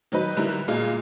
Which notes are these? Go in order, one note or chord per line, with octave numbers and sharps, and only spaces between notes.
D#3 F#3 D#4 B4
D3 G3 E4 A#4
A#2 G#3 F4